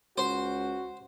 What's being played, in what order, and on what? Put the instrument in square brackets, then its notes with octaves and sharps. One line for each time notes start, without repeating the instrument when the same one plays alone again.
[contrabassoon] C#2 [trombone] F#4 [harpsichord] C5